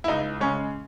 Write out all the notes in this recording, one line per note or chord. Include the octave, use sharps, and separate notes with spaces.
E4
C#2 D#4
C#3 G#3 C#4